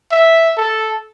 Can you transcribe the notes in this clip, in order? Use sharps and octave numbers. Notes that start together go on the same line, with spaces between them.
E5
A4